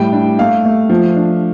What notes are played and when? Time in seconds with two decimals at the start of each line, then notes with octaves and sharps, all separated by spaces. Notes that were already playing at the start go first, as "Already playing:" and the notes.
Already playing: A2 G3 G5
0.12 D4
0.39 A3 F5
0.65 A3
0.90 F3
1.16 D4